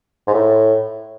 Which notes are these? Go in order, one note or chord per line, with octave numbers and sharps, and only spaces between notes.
G#2
A2